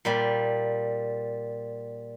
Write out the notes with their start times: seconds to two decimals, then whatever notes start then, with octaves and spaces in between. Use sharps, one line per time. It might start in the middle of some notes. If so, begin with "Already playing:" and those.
0.05 A#2 G3